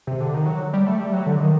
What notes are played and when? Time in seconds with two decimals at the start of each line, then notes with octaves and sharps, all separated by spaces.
0.07 C3
0.21 D3
0.34 D#3
0.46 F#3
0.73 G3
0.87 A3
0.99 G3
1.13 F#3
1.26 D3
1.40 D#3